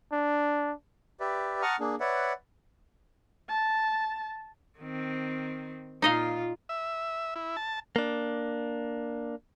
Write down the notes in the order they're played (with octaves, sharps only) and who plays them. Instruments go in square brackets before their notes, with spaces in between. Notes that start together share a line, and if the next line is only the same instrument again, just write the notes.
[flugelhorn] D4
[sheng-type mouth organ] G4 B4 D5 E5
F#5 A5 A#5 C#6 D#6 F6
A#3 D4 G#4
B4 C#5 D5 E5 F#5
[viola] A5
[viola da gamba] D#3 C4
[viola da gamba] A#2 F4 [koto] D#4 D#5 F5
[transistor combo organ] E5
E4
A5
[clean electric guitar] A#3 D4